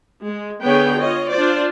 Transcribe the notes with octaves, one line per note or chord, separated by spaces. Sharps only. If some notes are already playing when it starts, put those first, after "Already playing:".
G#3
D3 B3 G#4 B4 C#5 G5
F4 C#5 D#5
D4 F4 C5 D5